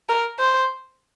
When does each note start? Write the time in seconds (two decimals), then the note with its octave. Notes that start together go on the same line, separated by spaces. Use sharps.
0.09 A#4
0.39 C5